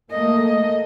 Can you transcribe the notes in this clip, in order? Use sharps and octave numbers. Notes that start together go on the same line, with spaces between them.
A3 A#3 D#5